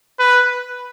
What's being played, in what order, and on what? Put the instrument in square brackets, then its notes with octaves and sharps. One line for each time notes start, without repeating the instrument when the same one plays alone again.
[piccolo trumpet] B4